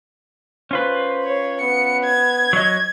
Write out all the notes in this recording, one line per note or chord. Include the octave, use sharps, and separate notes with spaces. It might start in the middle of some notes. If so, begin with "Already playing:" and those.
C#4 F4 B4 C5
C#5
B3 C#7
G#6
F#3 C#5 D#5